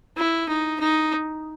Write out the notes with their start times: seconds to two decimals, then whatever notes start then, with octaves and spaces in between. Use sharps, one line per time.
0.17 E4
0.49 D#4
0.80 D#4